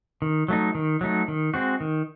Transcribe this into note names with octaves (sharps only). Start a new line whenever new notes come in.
D#3
F#3 A3 D#4
D#3
F#3 A3 D#4
D#3
G#3 C4 F#4
D#3